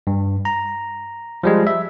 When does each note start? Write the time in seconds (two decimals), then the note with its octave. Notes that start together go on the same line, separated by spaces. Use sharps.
0.07 G2
0.45 A#5
1.43 F3 G3 G#3
1.67 E5